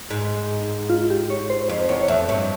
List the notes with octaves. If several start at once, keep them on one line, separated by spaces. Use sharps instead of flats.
G#2
F4
G4
C#5
C5
F2 C5
E2 C#5
C#5
F2 E5
G2 C#5